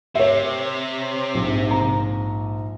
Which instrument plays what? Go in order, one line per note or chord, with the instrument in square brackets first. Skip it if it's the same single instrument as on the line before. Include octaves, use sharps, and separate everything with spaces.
[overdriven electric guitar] C3 [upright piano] C#5 E5
[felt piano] A#1 G#2
[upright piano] A#5